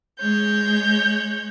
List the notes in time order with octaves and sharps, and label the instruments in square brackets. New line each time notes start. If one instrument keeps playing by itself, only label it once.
[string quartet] G#3 C#5 G6